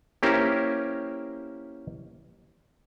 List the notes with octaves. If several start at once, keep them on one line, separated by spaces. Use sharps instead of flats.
A#3 C#4 E4 G4 A#4 C5